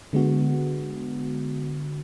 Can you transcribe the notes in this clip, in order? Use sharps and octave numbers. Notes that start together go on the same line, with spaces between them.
D3 G#3 B3 F#4